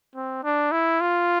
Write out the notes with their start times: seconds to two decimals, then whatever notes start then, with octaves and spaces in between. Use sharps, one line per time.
0.15 C4
0.44 D4
0.72 E4
1.01 F4